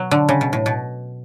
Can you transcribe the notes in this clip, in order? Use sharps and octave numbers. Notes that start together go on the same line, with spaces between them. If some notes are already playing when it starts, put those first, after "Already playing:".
Already playing: B2 F#3
D3
C#3
B2
A2
B2